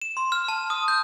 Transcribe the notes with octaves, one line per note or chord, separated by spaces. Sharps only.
E7
C6
F6
A5
D#6
G6